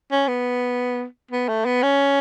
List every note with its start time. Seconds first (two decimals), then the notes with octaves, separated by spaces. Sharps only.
0.11 C#4
0.28 B3
1.31 B3
1.48 A3
1.65 B3
1.83 C#4